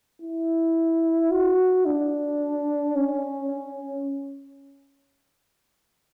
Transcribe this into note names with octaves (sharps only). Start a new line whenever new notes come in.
E4
F#4
D4
C#4